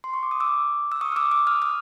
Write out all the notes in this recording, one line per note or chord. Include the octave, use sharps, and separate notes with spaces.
C6
C#6
D6
D#6
D6 E6
E6
C#6 D#6
F6
D6 E6
D6 E6
D#6 F6
D#6 F6